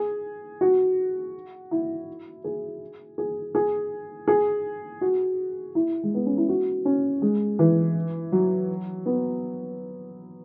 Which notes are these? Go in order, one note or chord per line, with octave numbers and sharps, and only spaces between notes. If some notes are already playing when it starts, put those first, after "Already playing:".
Already playing: G#4
F#4
E4
G#4
G#4
G#4
G#4
F#4
E4
G#3
B3
C#4
E4
F#4
C#4
G#3
E3
F#3
B3